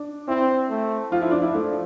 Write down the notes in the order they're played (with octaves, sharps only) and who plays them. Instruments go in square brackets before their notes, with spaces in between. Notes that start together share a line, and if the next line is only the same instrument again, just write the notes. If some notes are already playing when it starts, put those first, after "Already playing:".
Already playing: [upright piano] D4
[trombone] C4 [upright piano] E4
[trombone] A3
[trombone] F3 [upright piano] F4
[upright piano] E4
D4
E4
[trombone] F3 [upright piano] A3